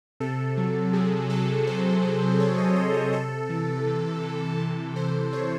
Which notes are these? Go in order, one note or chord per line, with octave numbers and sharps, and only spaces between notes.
C3 A4
F#3
C3 G#4
F#3 A4
C3 C5
F#3
C3 C#5
D#5
F#3 D#5
C#5
C3 A4
E3
C3
E3
C3 A4
E3 C5
C3 C#5